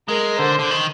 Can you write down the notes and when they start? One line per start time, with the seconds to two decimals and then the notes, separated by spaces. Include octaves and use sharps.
0.08 G#3 A#4
0.39 D3 C5
0.59 D3
0.71 D#3